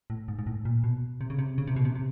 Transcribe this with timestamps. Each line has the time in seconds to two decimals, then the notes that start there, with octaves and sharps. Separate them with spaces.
0.10 A2
0.28 G#2
0.39 G#2
0.47 A2
0.65 A#2
0.84 B2
1.21 C3
1.30 C#3
1.39 C3
1.58 C#3
1.67 C3
1.76 B2
1.85 C3
1.95 C3